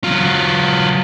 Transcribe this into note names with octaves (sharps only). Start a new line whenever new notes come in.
F#3 F4